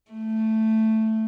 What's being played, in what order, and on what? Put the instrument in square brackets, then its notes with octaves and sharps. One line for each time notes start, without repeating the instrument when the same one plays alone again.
[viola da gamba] A3